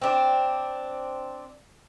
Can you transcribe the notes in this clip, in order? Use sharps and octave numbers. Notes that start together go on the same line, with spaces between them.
C4 D4